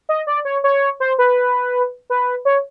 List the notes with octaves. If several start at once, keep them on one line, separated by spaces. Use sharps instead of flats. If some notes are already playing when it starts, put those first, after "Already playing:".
D#5
D5
C#5
C#5
C5
B4
B4
C#5